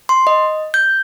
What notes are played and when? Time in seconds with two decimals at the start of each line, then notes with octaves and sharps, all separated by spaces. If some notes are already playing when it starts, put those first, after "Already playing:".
0.09 C6
0.27 D#5
0.74 G6